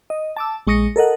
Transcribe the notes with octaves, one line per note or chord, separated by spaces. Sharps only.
D#5
A5 D6 E6
A#1 G#3 C#6 D#6 A#6 C#7
A4 A#4 D#5 F#5